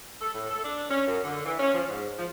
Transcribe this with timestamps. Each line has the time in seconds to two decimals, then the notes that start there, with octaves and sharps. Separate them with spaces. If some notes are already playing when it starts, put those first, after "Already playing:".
0.21 A4
0.34 A2
0.50 A4
0.64 D4
0.90 C#4
1.08 F#2
1.24 D3
1.45 E3
1.59 C#4
1.74 F3
1.89 G#2
2.18 F3